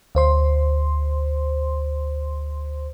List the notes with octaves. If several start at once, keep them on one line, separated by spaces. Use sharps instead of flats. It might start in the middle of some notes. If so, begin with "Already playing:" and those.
D2 C5 C6